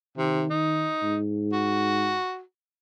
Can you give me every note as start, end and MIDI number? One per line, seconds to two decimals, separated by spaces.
0.18 0.44 48
0.18 0.88 51
0.50 1.18 63
1.03 2.16 44
1.52 2.41 66